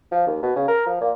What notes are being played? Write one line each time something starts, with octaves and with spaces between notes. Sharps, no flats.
F3
D#2
B2
C#3
A#4
F3
A#2